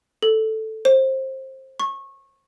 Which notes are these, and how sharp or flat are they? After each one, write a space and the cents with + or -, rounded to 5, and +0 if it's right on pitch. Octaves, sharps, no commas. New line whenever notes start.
A4 +0
C5 +20
C#6 -25